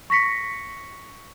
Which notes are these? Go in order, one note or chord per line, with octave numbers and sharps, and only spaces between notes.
C#6 A#6 B6 C#7